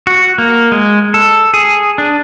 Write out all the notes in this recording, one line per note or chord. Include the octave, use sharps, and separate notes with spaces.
F#4
A#3
G#3
A4
G#4
D4